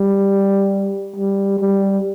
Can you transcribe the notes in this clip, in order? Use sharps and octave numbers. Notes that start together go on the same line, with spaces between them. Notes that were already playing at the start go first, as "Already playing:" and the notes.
Already playing: G3
G3
G3